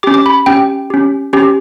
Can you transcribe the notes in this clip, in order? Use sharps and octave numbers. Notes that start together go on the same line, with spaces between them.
C#4 G4 D6
D6
B5
C#4 G4 G5
C#4 G4
C#4 G4